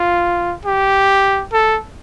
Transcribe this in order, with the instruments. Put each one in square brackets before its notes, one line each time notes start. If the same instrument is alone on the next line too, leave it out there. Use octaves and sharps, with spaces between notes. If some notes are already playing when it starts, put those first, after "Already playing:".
Already playing: [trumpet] F4
G4
A4